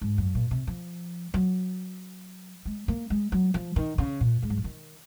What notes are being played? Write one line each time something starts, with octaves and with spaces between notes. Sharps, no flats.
G#2
F#2
A#2
C3
F3
F#3
G#3
A#3
G#3
F#3
F3
D#3
C#3
A#2
G#2
F#3
F3
D#3